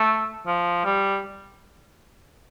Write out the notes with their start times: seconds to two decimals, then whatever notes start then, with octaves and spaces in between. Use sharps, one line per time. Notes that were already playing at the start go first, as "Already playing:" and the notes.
Already playing: A3
0.47 F3
0.85 G3